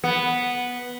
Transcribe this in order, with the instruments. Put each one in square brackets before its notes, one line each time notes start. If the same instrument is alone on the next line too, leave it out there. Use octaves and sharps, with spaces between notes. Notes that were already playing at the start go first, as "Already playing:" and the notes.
[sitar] B3